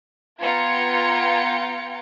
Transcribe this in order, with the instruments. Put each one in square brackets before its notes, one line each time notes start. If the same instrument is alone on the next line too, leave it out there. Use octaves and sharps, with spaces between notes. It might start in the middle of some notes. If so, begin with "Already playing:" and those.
[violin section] B3 F4 G5 A#5 G#6 C#7